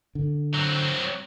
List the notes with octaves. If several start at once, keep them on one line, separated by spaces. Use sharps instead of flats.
D3
F#3 C4